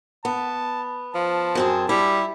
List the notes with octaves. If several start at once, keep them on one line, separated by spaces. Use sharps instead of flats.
B3 A5
F3 A5
F#2 C4 G#4
G3 E4